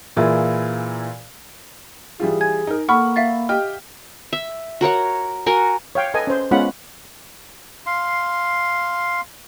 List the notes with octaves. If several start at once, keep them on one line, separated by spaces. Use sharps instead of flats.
A#2 E3 E4 F4 G#4 A#4
E3 G3 F4 G#4
G#5 G#6
D#4 A#4
A#3 A4 F#5 B5 C#6 F6
E5 F5 A6
G4 D#5 G5 F6
E5
F#4 A#4 C#5 F#5
F#4 A#4 G#5
C#5 F5 G5
A4 B4 D#5 G#5
C#4 C5
G#3 B3 C#4 F4 F#5 B5
F5 C6